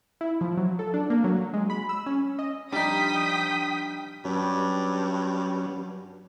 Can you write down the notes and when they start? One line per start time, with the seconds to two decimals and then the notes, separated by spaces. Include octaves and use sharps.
0.21 E4
0.41 F3
0.57 F#3
0.79 A4
0.94 D4
1.10 A#3
1.24 F#3
1.54 G#3
1.70 B5
1.89 E6
2.06 C#4
2.39 D#5
2.73 F3 G3 D4 D#4 G5 D#6 B6
4.25 G2 F#3 C#4